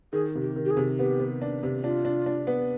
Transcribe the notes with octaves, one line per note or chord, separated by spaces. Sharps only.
D#3 G#4
C3
G4
D#3
G4
G#4
C3
B3 G4
B3
D4
C3
D4 F4
D4
D4
B3